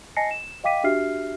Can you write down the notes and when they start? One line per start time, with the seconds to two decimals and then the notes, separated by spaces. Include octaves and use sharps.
0.16 D#5 G#5 A5 A#6 C7 C#7
0.31 E7
0.64 D#5 F5 G5 D6 B6 D#7
0.84 D4 F#4 G4 E5 F6 C7